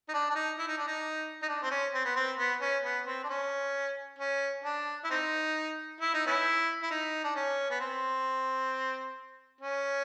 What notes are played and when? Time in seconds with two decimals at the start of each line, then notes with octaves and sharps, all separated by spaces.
0.09 D#4
0.13 D4
0.30 D4
0.35 D#4
0.58 E4
0.68 D#4
0.78 D4
0.87 D#4
1.42 D#4
1.48 D4
1.63 C4
1.71 C#4
1.93 C4
2.05 B3
2.16 C4
2.39 B3
2.61 C#4
2.84 B3
3.07 C4
3.24 D4
3.29 C#4
4.19 C#4
4.64 D4
5.04 E4
5.10 C4 D#4
6.00 E4
6.14 D#4
6.27 B3 C#4 E4
6.83 E4
6.91 D#4
7.24 D4
7.36 C#4
7.71 B3
7.80 C4
9.61 C#4